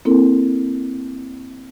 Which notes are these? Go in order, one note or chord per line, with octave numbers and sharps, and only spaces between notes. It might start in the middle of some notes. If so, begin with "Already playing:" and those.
A#3 C4 E4 A4 A#4